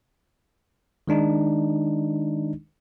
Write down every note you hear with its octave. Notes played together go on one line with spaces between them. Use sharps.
D#3 G#3 D4 D#4